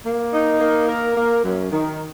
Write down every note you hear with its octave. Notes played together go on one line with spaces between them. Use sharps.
A#3
D#4
A#3
A#4
A#3
F#2
D#3